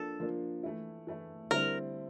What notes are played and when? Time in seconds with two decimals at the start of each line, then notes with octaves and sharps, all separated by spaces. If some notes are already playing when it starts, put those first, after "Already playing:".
Already playing: F3 A#3 D4 A4
0.20 F3 A#3 D4
0.63 E3 A3 E4
1.07 E3 A3 E4
1.51 D3 G3 C4 E4 A#4